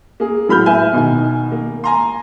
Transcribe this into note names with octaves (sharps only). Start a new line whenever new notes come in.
A#3 G#4
A2 F#3 B5 F6 G6
B4 E5 G#5
B2 D#3 G#5
A#3
G#5 A#5 C6